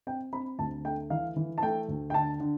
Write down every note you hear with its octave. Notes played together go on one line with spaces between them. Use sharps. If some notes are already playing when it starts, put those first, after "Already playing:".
C4 G5
C4 B5
D2 A5
A3 G5
E3 F5
E3
A5
A3 G5
D2
G5
D3 A5
D3